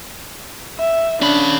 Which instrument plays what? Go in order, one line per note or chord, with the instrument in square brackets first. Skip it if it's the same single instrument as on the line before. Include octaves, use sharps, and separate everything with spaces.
[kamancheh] E5
[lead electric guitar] C#4 B5 [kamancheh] D4